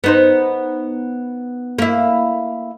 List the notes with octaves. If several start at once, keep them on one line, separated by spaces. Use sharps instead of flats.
B3 D#4 C5
A#3 E4